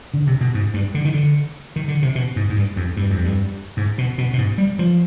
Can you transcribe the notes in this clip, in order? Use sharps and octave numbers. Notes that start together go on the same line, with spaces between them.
D3
C3
B2
G#2
G2
D3
D#3
D3
D#3
D3
C3
B2
G#2
G#2
G2
F2
G2
F2
G2
G#2
B2
B2
B2
G#2
G3
F3